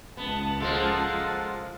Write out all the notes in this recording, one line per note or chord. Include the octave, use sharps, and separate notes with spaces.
C#2 B3 A5
F3 G#3 A#3 F4 A4 F#5